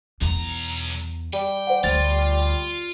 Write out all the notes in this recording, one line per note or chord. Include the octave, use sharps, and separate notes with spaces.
B1 E2 A#5
G3 G5
C5 F#5
D2 F4 A6